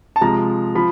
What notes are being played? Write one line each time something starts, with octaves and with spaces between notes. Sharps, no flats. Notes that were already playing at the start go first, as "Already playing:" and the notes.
A5
C3 F3 G#3 A#5
F3 B5